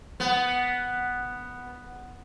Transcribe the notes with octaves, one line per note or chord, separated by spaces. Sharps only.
B3